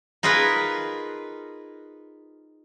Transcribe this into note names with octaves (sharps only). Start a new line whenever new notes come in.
D#4 F4 G#4 A#4 B4